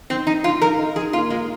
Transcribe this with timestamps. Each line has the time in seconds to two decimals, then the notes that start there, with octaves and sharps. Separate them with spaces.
0.10 D#3 C4
0.27 D#3 D#4
0.44 D#3 F4
0.62 D#3 A#4
0.79 D#4
0.96 D#3 G#4
1.13 A#3 F4
1.30 G#3 F4